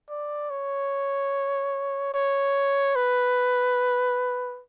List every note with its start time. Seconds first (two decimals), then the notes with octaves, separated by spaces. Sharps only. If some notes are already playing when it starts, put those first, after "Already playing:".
0.09 D5
0.50 C#5
2.14 C#5
2.95 B4